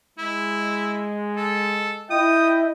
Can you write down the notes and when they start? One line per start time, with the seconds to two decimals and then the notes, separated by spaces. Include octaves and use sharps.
0.18 G#3 E4
1.37 A4
2.10 E4 D#5 G5 D#6